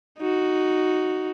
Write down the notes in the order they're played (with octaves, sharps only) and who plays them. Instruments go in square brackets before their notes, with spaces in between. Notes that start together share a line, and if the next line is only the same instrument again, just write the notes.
[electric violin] D#4 F#4